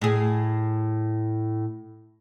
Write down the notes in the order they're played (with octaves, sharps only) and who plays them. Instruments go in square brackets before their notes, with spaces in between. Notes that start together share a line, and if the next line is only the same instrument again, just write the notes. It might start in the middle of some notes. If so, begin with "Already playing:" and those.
[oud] A2 G#4